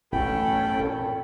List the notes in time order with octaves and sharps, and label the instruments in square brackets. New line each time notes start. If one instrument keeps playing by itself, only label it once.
[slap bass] A1 F#2 B2 [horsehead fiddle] C#4 A4 [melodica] G5 B5
[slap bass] A#2